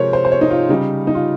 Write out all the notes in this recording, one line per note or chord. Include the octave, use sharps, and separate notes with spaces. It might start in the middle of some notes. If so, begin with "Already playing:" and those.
Already playing: C3 F3 G#3 A#4 C5 C#5
C5
C5
C#5
D#4
F4
C#3 G3 D#4
D#4
F4